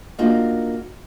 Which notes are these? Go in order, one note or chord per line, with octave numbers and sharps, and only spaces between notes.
A#3 D4 D#4 F4 F#4 G#4